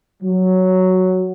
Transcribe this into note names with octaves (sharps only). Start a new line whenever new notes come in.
F#3